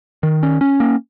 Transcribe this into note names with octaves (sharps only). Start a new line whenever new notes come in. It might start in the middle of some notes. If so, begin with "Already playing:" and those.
D#3
C#4
C#4
A#3